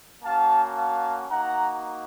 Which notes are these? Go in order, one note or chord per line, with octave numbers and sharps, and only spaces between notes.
A#3 C#4 F#4 F5 A5
F5 A5
A#3 D#4 F#4 F#5 A#5